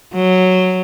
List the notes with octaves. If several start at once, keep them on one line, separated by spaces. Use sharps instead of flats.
F#3